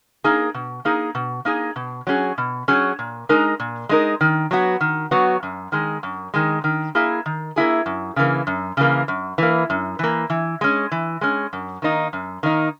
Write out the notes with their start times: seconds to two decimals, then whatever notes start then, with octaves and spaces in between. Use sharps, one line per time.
0.24 A#3 D#4 G#4
0.54 B2
0.85 A#3 D#4 G#4
1.15 B2
1.45 A#3 D#4 G#4
1.76 B2
2.07 F#3 C#4 G#4
2.38 B2
2.68 F#3 C#4 G#4
2.99 A#2
3.29 G#3 D#4 A#4
3.60 A#2
3.89 G#3 D#4 A#4
4.21 D#3
4.51 F#3 B3 F#4
4.81 D#3
5.11 F#3 B3 F#4
5.43 F#2
5.72 D#3 G#3
6.03 F#2
6.34 D#3 G#3
6.64 D#3
6.95 A#3 E4 G#4
7.26 D#3
7.56 A#3 E4 G#4
7.86 F#2
8.16 C#3 E3 A#3
8.47 F#2
8.77 C#3 E3 A#3
9.08 F#2
9.38 E3 A#3
9.70 F#2
9.99 E3 A#3
10.30 E3
10.61 G#3 C#4
10.92 E3
11.21 G#3 C#4
11.53 F#2
11.82 D#3 A#3 D#4
12.13 F#2
12.43 D#3 A#3 D#4